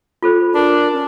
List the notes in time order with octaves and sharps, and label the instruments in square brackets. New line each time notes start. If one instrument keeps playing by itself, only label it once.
[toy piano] F4 A4 C5
[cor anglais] D4 [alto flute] A#4
[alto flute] C#4